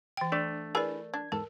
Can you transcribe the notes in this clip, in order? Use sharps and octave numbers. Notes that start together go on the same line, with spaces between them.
E3 G5
A3 D4 D5
E4 G#4 A#4 B4 D5
D4 G#6
E2 G#2 A4 A#4